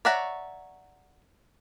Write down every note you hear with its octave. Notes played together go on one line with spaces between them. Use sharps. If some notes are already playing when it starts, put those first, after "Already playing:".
C#5 D5 E5 F#5 A#5